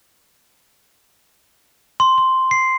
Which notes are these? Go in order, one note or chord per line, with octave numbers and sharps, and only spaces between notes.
C6
C6
C7